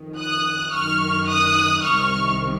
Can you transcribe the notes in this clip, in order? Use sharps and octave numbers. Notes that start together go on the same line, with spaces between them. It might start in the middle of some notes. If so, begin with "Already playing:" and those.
Already playing: F2 D#3
D#6 F#6
F#2 D#3 C#6 F6
D#6 F#6
C2 C3 D#3 C#6 F6